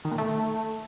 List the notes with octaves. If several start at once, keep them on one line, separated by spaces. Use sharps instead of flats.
D#3
A#2
A3